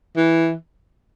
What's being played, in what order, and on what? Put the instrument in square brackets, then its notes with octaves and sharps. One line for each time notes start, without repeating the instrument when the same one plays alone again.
[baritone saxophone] E3